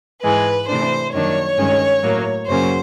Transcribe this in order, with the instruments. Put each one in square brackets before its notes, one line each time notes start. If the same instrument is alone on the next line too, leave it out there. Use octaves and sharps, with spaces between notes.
[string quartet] G#2 E3 G#3 B4
C3 E3 A3 D4 C5
F#2 D#3 G3 A#3 D4 C#5
G2 D#3 G#3 C#4
A2 F#3 A#3
F#2 C#3 F#3 A#3 C#4 C5